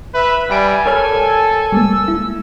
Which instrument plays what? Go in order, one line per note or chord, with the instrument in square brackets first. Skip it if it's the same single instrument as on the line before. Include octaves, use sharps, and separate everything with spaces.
[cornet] B4 [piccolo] E5
[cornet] G3 [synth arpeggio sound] E5 B5 D7 [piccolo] G#5
[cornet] A4 [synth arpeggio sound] A#4 C#5 F6
[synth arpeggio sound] G3 G#3 A#3 [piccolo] E6
[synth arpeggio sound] E4